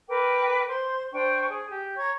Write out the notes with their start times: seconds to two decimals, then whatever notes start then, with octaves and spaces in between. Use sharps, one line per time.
0.08 A#4 B4 G5 D6
0.68 C5 C6
1.13 D4 C5 G5 C#6
1.48 G#4
1.70 G4
1.97 C#5 A#5 C#6 G#6